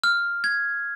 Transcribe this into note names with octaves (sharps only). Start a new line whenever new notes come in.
F6
G#6